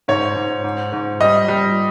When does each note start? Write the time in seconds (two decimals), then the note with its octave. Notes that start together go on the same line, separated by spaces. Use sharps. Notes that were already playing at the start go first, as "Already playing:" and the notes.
0.08 G#2 C#5
0.36 G#2
0.64 G#2
0.93 G#2
1.20 G3 D#5
1.48 G3